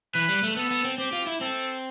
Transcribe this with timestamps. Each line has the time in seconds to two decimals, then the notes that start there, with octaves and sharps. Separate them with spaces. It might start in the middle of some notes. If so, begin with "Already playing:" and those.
0.14 E3 B4
0.28 G3
0.43 A3
0.56 B3 A4
0.71 B3
0.84 C4
0.98 C4 G4
1.13 F4
1.27 E4
1.41 C4 A4